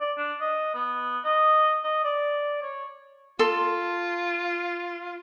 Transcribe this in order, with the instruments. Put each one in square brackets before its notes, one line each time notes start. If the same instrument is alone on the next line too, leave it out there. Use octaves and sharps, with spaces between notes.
[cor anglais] D5
D4
D#5
B3
D#5
D#5
D5
C#5
[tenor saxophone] F4 [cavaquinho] A4 C6